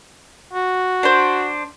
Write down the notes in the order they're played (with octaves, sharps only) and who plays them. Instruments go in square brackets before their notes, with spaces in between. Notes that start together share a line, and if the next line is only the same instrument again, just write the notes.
[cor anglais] F#4
[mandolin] D4 C5